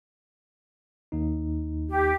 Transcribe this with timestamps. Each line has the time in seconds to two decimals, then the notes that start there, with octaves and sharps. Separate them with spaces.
1.12 D#2 D#4
1.89 G4